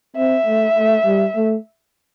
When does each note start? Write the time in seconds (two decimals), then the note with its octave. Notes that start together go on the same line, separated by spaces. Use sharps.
0.17 C4 E5
0.46 A3
0.76 A3
1.06 G3
1.36 A3